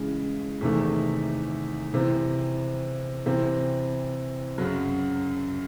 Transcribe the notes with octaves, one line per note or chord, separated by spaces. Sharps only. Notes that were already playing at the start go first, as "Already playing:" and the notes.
Already playing: C#3 E3 G#3
E2 C3 D#3 A3
C3 E3 C4
C3 E3 C4
F#2 C#3 F#3